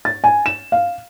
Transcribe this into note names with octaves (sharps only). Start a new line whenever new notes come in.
A6
G#5
E7
F5